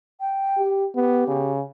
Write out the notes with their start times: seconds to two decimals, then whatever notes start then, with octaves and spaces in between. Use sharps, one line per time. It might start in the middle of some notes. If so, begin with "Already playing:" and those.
0.20 G5
0.57 G4
0.95 B3 G4
1.28 C#3